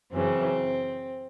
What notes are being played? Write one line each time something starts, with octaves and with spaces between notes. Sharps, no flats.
F#2 C#3 E3 C4